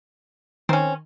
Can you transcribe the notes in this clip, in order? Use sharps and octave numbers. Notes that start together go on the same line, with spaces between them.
D#3 C4 C#4